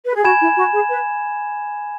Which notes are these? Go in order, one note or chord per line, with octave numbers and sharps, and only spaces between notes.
B4
G#4
F#4 G#5 B5 G#6 E7
E4
F#4
G#4
B4